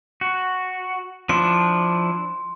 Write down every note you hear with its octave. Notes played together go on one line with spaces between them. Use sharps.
F#4
F3 D4 E4 C6